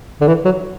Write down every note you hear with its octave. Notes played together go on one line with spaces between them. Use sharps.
D3
E3
F#3